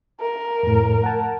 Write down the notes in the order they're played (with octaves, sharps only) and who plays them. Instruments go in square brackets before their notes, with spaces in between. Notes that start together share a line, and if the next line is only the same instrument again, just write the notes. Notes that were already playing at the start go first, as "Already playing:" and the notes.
[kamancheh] A#4
[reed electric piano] F2 A2
F#5 A5